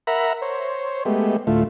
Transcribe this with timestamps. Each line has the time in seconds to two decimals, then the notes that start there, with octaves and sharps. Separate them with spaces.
0.07 A#4 E5 F#5 A#5 B5
0.42 C5 C#5
1.05 G#3 A3 B3 G4
1.47 D2 A2 A3 F4